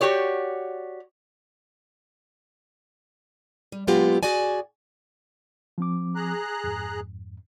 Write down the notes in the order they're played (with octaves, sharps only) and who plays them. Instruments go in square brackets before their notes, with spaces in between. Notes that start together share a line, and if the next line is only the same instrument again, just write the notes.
[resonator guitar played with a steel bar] F#4 G4 C#5 D5
[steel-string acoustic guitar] G3
A#2 F#3 G#3 B3 F4 G4
F#4 G#4 D5 G#5
[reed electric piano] F3 C4 D6
[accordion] G#4 A#5 F#6
[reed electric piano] F2 G#2